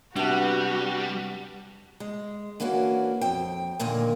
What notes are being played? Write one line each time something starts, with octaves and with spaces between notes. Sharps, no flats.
C3 G3 B3 D4 F#4 A5
G#3
E3 A#3 C#4 D4 F#4
F2 G5
F2 A#2 D3 D#3 A#4 G#5